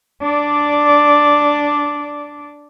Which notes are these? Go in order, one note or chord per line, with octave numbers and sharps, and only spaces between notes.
D4 D5